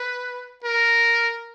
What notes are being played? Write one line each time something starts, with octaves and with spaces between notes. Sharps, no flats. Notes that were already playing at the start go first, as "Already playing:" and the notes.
Already playing: B4
A#4